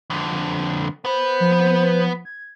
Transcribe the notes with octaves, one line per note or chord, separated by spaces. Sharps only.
F2 D3
B3 B4 C5
F3
G#6